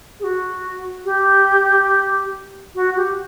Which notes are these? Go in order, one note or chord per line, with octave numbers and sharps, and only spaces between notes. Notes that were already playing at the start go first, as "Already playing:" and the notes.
G#4
F#4
G4
F#4
G4